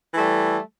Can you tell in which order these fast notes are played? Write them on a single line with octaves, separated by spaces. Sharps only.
E3 A3 G3